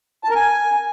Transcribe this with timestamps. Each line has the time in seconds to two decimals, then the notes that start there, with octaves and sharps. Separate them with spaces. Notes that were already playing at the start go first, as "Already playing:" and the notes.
0.24 A5
0.30 A#4
0.35 G#5